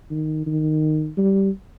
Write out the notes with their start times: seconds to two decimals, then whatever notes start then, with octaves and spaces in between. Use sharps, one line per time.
0.11 D#3
0.46 D#3
1.18 G3